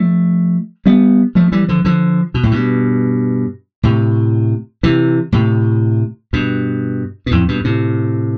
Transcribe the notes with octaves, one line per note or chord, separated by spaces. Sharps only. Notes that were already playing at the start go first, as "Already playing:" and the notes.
Already playing: F3 A3
G3 B3
F3 A3
E3 G3
D3 F3
D3 F3
B2
A2
G2 B2
A2 C3
C3 E3
A2 C3
G2 B2
B2
F2 A2
G2 B2
A2 C3